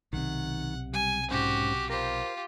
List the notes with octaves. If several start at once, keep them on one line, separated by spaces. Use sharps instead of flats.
B1 C3 D#3 F#5
G3 G#5
G#2 C#4 F#4 G4 C5
F4 G4 A#4 C5